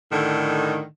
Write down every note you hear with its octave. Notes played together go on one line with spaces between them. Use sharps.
A2 D3 D#3